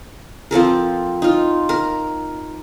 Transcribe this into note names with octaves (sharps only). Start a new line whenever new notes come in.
F3 C4 A4 A#4
D#4 F4
A#4